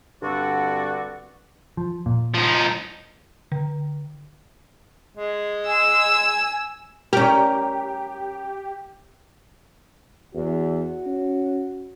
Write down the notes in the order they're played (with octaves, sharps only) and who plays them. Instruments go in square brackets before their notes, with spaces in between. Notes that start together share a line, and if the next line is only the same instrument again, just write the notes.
[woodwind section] G2 D3 C4 F#4 D5 F#5
[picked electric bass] F3
A#2
[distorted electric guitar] F3 D#4
[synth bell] D3
[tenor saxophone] G#3
[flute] G#5 [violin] E6
[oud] C#4 A#4 [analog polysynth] G4
[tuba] E2 [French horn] F#4
[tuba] C#4